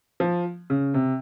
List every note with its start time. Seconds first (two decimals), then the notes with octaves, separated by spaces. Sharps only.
0.20 F3
0.70 C#3
0.94 C3